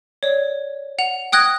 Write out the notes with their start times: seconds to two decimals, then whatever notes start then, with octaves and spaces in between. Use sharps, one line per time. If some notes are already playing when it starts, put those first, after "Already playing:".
0.23 C#5 D5
0.99 F#5 F7
1.32 G5 D#6 F#6 G#6 A#6